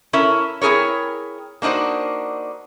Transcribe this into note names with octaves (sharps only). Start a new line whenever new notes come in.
C#4 E4 A4 A#4
C4 E4 G#4 A#4 C#5
A#3 D4 D#4 F#4 C5